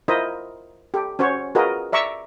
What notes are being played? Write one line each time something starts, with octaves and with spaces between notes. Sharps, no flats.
E4 F4 A#4 C5 D#5 E5
G4 A4
C#4 F#4 C5 C#5
F4 F#4 G#4 A#4 B4 D#5
D5 E5 A#5 C#6 D6 E6